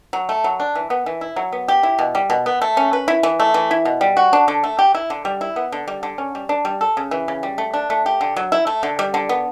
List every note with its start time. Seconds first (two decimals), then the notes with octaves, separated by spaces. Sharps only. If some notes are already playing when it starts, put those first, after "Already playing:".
0.13 F#3
0.29 A3
0.44 F#3
0.60 D4
0.75 E3
0.90 B3
1.06 E3
1.21 E4
1.36 F#3
1.52 B3
1.68 G4
1.83 E4
1.99 B2
2.15 G3
2.30 B2
2.46 B3
2.62 A3
2.77 C#4
2.93 B4
3.08 E4
3.23 E3
3.40 A3
3.54 E3
3.71 E4
3.85 B2
4.01 G3
4.17 F#4
4.33 D4
4.48 D3
4.64 A3
4.79 G4
4.95 E4
5.10 D3
5.25 G3
5.41 E4
5.56 B3
5.72 D3
5.88 G3
6.03 D3
6.18 C#4
6.35 G3
6.49 D4
6.65 G3
6.81 A4
6.97 C#3
7.11 E3
7.28 C#3
7.43 G3
7.58 A3
7.74 D4
7.90 A3
8.06 G4
8.21 D3
8.36 F#3
8.52 E4
8.67 A3
8.83 D3
8.99 G3
9.14 D3
9.29 B3